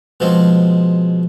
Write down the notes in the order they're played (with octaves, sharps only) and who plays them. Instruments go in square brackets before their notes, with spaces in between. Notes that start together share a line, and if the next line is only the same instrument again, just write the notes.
[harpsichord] B2 F3 G#3 C4